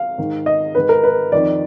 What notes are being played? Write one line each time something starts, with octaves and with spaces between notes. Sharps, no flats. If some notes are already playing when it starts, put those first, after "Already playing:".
Already playing: F5
G#2 D#3
D#5
G#2 D#3 B4
A#4
B4
F2 D#3 D5